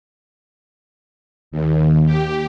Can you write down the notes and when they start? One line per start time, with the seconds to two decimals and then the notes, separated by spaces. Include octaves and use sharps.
1.51 D#2
2.06 G4